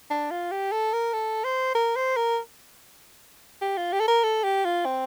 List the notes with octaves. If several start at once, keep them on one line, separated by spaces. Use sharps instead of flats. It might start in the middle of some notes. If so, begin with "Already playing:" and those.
D4
F4
G4
A4
A#4
A4
C5
A#4
C5
A#4
G4
F4
G4
A4
A#4
A4
G4
F4
C4